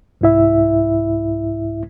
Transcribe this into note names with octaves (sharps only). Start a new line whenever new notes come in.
C2 G#2 E4 E5